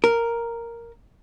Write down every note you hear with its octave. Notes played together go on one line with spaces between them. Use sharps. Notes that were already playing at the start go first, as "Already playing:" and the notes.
A#4